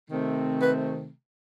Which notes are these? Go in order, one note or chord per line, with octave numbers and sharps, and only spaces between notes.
C3 D#3 A3 C4
B4